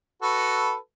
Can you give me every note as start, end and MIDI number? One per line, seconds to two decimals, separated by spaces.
0.22 0.75 66
0.22 0.75 69
0.22 0.75 71